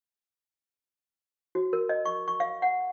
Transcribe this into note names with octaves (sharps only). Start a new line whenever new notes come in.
F#4
A#4
D#5
C#6
C#6
F5
F#5